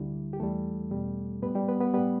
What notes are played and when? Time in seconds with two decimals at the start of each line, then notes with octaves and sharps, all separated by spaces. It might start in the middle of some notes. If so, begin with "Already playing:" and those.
Already playing: D2 D3 G3 E4
0.33 G4
0.39 E2 E3 G3 A3 A4
0.91 E2 B2 G3
1.42 A2 G3 B3 B4
1.55 G3 G4
1.68 B3 B4
1.81 B3 B4
1.94 A2 G3 B3 B4